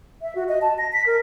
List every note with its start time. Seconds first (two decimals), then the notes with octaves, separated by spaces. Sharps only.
0.22 E5
0.35 F#4
0.49 D#5
0.62 A5
0.78 A#6
0.93 B6
1.06 A#4